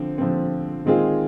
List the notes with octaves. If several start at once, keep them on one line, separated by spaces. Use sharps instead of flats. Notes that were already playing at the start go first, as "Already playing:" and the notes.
Already playing: D3 F3 C4
D3 F3 C4
D#3 G#3 C4 F4 G#4